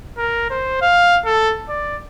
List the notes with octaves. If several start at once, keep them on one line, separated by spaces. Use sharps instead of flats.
A#4
C5
F5
A4
D5